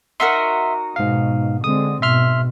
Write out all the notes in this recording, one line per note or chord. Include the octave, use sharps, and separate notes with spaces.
D#4 F#4 A#4 E5 C6
G#2 B2 F5
D3 G#3 C4 D#6
G#2 B2 E5 C6 F6